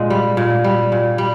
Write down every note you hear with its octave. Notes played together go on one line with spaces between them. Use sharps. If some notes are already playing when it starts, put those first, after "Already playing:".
Already playing: A#2 G#3
G3
A#2
G3
A#2
G3